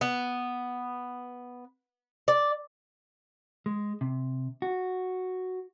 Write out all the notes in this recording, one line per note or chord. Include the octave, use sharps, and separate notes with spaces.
B3
D5
G#3
C3
F#4